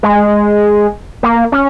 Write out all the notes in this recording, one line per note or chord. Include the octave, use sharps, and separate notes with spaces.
G#3
A#3
C#4